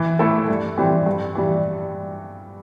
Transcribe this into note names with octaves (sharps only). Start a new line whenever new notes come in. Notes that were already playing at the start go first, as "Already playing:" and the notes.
Already playing: E3
A3 E4 A4
G2
E3 G3 C4
G2
E3 G3